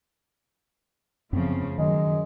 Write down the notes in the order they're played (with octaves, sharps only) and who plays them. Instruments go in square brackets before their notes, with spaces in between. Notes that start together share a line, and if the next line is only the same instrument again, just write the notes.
[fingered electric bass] F#2 B3 C4 [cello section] C#3 F3 A3
[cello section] F#2 [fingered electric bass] D#3 [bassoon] G#3